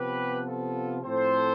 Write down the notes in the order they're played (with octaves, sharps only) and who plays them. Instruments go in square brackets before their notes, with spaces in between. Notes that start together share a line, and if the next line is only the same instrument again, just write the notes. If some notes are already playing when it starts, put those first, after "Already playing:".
Already playing: [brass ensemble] C3 F3 B3 G4 B4
F4 A4
A2 F3 C4 A4 C5